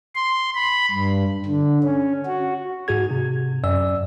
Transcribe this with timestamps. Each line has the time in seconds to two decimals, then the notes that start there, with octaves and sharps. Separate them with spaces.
0.15 C6
0.55 B5
0.91 G2
1.45 D3
1.83 C#4
2.26 F#4
2.88 G#2 F#4 G#4 G#6
3.11 C3
3.64 F#2 D5 E6